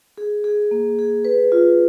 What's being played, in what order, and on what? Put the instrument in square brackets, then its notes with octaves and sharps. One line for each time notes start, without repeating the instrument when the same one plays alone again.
[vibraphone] G#4
G#4
A#3
G#4
B4
F4